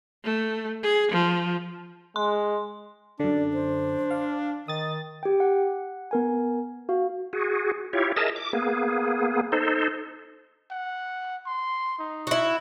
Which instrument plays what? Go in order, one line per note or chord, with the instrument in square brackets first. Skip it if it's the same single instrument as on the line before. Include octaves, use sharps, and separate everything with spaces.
[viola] A3
G#4
F3
[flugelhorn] G#3 [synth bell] C6
[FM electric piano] F#2 D3 [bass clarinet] D4 [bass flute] D5
[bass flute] C5
[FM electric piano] F5
[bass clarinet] D#3 [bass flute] D#5 [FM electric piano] D#6 A6
[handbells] G4 G5
F#5
B3 A#4 G#5
F#4 F5
[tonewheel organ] F#4 G#4
E4 F4 G4 C#5
G#4 A#4 D#5 E5 A5
D6
A#3 B3 G#4
D#4 A4 C5
[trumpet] F#5
C6
D#4
[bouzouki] E4 F#4